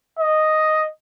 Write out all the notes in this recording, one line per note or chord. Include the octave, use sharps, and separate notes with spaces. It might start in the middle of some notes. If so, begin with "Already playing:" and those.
D#5